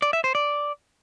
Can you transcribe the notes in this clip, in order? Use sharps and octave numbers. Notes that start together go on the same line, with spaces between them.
D5
E5
C5
D5